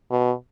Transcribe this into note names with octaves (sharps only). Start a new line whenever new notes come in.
B2